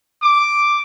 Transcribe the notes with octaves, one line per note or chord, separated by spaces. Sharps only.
D6